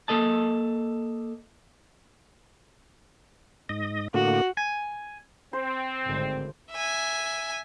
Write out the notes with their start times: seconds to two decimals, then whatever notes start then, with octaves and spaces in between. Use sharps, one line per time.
0.08 A#3 A4 D#5 A5
3.69 G#2 D#5
4.14 A2 D3 A#3 F#4
4.57 G#5
5.53 C4 C5
6.06 G#1 A2 D3
6.72 E5 G#5